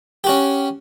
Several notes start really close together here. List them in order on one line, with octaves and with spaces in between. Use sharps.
G4 F#4 C#4